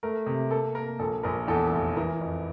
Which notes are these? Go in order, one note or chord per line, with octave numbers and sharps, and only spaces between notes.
A3 A#4
C3
A#3 A4
A#3 A#4
A#1 A4
A#1 A#4
E2 A4
A4
F1
E3 A#4
F2